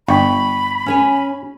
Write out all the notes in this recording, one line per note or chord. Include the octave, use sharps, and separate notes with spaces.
G1 G5 B5 C#6
C#4 C#5 G#5